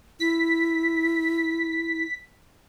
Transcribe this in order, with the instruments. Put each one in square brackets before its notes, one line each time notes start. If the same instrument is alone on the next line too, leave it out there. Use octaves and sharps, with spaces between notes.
[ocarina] E4 [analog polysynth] B6